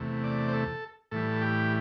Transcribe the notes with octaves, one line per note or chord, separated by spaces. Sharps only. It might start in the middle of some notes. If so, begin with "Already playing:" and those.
Already playing: E2 C3 A3
D5
C5
A4
A2 E3 G3 A4
G4